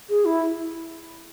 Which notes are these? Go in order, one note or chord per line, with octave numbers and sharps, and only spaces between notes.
G#4
E4